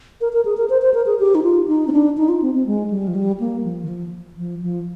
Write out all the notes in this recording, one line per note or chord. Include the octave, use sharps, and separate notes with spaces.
A#4
A#4
G#4
A#4
C5
C5
A#4
G#4
G4
D#4
F4
D#4
C4
D4
D#4
F4
C4
C4
G#3
G3
F3
G3
A#3
F3
D#3
F3
F3
F3